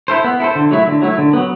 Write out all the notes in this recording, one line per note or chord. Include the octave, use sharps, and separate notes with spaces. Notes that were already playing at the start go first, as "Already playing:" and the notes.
E4 A4 C5
B3
E4 A4 C5
D3
F#3 A3 E4
D3
F#3 A3 E4
D3
F#3 B3